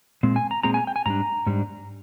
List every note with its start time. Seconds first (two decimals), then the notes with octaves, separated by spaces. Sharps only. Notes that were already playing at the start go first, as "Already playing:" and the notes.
0.23 A#2 G#3 C4
0.36 G#5
0.51 A#5
0.63 A#2 G#3 C4 A#5
0.74 G#5
0.87 G5
0.96 G#5
1.06 G#2 G3 D4 A#5
1.47 G#2 G3 D4